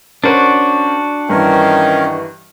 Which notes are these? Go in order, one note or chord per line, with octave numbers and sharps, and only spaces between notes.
C#4 D4 F#4 A#4 C5
G2 D#3 E3 C#4 A#4